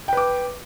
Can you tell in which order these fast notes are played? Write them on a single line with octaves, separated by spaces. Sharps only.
G5 B4 D6